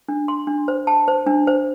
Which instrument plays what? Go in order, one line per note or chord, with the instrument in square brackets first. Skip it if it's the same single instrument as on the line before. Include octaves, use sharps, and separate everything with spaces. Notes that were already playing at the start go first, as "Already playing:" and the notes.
[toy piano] D4
C6
D4
C5
A5
C5
D4
C5